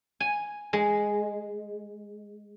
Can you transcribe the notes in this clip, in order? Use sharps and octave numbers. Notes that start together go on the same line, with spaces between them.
G#5
G#3